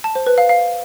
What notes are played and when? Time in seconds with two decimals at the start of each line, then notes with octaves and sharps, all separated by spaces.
0.04 A5
0.15 C5
0.26 B4
0.38 F5
0.49 F5